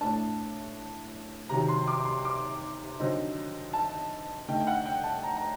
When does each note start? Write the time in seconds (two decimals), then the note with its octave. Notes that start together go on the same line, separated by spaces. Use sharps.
0.01 A2 A3 D4 A5
1.49 C3 D#3 F#3 A#5
1.68 C6
1.87 D6
2.05 C6
2.25 D6
3.00 D3 F#3 C4 D#4
3.74 A5
4.48 D3 A3 D#4 G5
4.60 G5
4.67 F#5
4.85 G5
5.04 A5
5.23 A#5
5.37 A#5